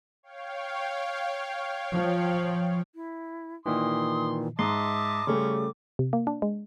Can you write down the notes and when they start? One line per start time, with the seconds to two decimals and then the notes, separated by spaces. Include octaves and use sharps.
0.23 C#5 F5 G5
1.93 F3
2.95 E4
3.66 A#2 D#3 E3 C6 D#6
4.59 G#2 D#5 E5 A5 C6 D6
5.27 C#3 G3 A3 C#4
5.99 C3
6.13 A#3
6.27 D4
6.42 G#3